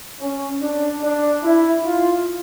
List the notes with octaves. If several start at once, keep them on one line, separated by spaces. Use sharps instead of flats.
C#4
D4
D4
E4
F4